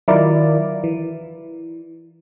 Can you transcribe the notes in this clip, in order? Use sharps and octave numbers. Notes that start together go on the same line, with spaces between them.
D#3 F#3 E4 F4 A#4 D5
E3